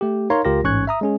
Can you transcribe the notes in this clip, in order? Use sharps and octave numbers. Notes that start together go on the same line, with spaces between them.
A3 G4
D#4 A#4 C#5 F5 A#5 C6
C#2 F4 G4 A#4 A#6
A1 G#2 C#4 C#6 F#6 G#6
E5 A#5 D#6
G#3 C#4 G#4